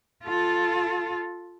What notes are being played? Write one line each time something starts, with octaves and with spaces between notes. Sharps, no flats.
F4 A4